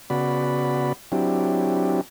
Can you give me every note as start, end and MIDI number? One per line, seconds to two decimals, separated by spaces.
0.10 0.93 49
0.10 0.93 59
0.10 0.93 66
0.10 0.93 74
0.10 0.93 83
1.12 2.01 54
1.12 2.01 60
1.12 2.01 62
1.12 2.01 64
1.12 2.01 67